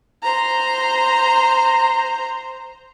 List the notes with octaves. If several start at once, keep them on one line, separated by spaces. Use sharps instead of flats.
C5 A#5